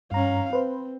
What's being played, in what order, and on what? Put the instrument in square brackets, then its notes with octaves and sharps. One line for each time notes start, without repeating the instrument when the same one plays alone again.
[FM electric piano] G2 A#5 [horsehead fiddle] C#4 F5
[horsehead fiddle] C4 [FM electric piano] B4 C5